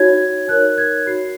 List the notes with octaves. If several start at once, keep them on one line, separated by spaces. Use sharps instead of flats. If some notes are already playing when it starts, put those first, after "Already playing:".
Already playing: D#4 F#4 C#5 G#6
D#4 A#4 C#5 F#6
G#6
F#4 C#5 C7